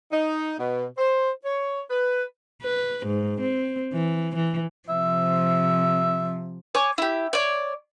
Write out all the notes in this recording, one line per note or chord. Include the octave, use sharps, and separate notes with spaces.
D#4
B2
C5
C#5
B4
B4
G#2
C4
E3
E3
C3 F3 E5
C#5 G#5 D6
E4 G4
C#5 D5